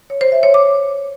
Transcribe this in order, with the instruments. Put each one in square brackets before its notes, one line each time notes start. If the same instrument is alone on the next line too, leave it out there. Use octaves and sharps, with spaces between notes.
[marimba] C#5
C5
E5
C#5
D6